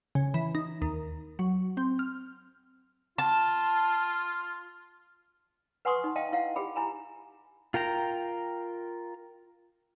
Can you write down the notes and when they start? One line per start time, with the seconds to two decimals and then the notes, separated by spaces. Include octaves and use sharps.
0.15 C#3
0.34 E3
0.55 D#4
0.82 D#2
1.39 F#3
1.77 C4
1.99 F6
3.18 F4 A5
5.85 B4 F#5 G#5 C6 C#6 D#6
6.04 D#4
6.15 D#5 F5 G5 A5
6.32 E4 F5 F#5
6.56 G4 G#4 B5
6.76 E4 G#5 A#5 B5
7.74 F4 A#4 G5 A#5